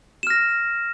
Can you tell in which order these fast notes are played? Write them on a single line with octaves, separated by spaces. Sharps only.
E7 F6 A#6